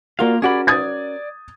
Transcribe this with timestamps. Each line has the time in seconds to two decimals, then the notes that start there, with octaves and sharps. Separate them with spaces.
0.19 A#3 F4 F#4 A#4 D5 F5
0.42 C#4 F#4 G#4 A#4 D5 B5
0.67 D5 D#6 G#6 A6